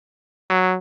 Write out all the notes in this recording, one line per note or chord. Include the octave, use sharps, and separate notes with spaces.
F#3